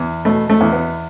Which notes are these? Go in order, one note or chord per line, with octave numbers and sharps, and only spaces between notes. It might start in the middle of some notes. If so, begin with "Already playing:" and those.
Already playing: E2
B2 A3
A3
E2
B3